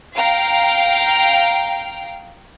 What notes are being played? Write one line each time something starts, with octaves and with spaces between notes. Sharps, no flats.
F5 G5 A#5